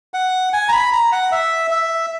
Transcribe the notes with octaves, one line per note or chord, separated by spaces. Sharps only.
F#5
G#5
A#5
B5
A#5
F#5
E5
E5